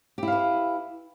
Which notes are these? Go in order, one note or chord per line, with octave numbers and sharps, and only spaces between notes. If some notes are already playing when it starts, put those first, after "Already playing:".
E4 G4 B4 F5